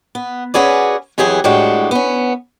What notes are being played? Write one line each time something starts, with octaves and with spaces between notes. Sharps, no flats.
B3
C#4 F#4 G#4 B4 D5
F2 E3 F#3 G4 G#4
A2 G3 G#3 D4 F#4 G4
B3 C#4